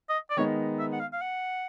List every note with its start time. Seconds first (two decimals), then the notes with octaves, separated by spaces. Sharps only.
0.09 D#5
0.30 D5
0.37 D#3 G#3 B3 D#4 C#5
0.79 E5
0.92 F#5
1.00 F5
1.13 F5
1.21 F#5